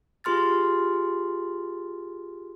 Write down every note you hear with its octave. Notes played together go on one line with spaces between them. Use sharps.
F4 G4 G#4 C6 F6 A6